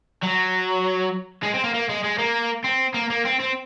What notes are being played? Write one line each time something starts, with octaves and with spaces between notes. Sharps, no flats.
F#3
G#3
C4
A#3
A#3
G#3
G#3
A#3
C4
A#3
A#3
C4
C4